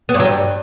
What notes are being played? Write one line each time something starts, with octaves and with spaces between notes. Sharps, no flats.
B3
G2
F#3
G2